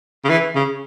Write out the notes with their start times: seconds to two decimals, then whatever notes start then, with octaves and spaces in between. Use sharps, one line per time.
0.24 C#3
0.29 E3
0.55 C#3